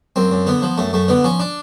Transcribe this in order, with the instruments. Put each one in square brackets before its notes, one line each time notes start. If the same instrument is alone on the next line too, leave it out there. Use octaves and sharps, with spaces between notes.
[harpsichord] F#2 C4
F#2
D3 B3
F3
F#2 A3
F#2 A3
D3 B3
F3 C#4
D4